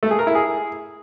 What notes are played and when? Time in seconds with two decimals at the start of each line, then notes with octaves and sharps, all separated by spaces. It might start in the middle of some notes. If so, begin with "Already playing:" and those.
0.03 A3
0.11 G#4
0.19 A#4
0.27 E4
0.35 G#4